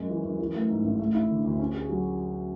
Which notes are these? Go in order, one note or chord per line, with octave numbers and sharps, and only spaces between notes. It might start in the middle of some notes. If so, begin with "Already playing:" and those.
Already playing: F#2 G#3
E3
F#2
E3
A3
G#2
A1
A3
E4
D3
D2
C#4
G#4
F#3